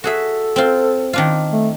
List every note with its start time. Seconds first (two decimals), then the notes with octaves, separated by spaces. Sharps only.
0.04 F#4 G#4 A4 E5
0.56 C4 F4
1.13 D#3 D4 F4
1.52 A3